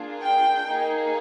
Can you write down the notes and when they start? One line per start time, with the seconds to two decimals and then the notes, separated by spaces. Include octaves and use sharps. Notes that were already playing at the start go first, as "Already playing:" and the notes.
Already playing: A#3 D4 F4 G#4
0.23 G5
0.67 A#3 D#4 G#4